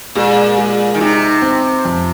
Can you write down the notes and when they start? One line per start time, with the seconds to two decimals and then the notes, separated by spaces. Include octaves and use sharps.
0.15 A#2 G#3
0.58 G#3
0.94 D#3
1.01 C3 D#4
1.42 C4
1.85 F2